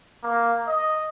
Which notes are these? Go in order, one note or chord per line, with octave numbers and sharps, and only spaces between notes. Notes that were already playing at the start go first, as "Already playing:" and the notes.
A#3
D#5